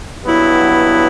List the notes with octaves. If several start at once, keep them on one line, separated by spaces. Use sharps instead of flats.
G2 F#3 B3 E4